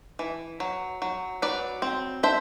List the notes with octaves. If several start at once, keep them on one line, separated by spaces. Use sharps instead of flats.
E3
F#3
F#3
F#3 B4 D5
C4
D4 C5 E5